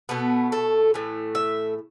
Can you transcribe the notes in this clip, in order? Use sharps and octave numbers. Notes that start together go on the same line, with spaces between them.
B2 A3 B3
A4
A2 E3 A3
E5